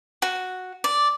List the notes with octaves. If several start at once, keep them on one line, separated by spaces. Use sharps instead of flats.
F#4
D5